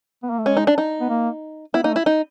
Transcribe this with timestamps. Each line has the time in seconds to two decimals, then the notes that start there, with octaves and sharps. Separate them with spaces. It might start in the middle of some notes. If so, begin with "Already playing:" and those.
0.23 B3
0.30 A#3
0.39 A3
0.45 G#3 C#4
0.57 D#4
0.67 D4
0.78 D#4
1.01 B3
1.10 A#3
1.74 B3 E4
1.83 A#3 D#4
1.90 A3
1.96 E4
2.06 D#4